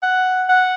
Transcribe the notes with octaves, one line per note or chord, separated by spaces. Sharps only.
F#5
F#5